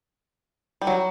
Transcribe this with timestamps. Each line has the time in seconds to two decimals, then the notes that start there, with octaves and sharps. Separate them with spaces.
0.82 G3
0.87 F#3